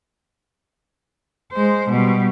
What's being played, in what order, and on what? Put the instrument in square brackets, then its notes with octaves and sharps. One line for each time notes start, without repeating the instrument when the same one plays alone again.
[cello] G#3 C5
B2 G3